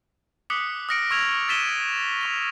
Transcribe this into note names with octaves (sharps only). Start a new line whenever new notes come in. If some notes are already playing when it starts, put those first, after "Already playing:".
D6 D#6 F#6 B6 C#7 G7
D#6 F6 A#6 C#7 D7
C#6 E6 F6 G#6 B6 F7
E6 A6 B6 D#7 E7 G7
C#6 F7 G7